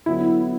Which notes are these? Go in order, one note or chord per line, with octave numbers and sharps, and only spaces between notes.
D3 F#3 B3 E4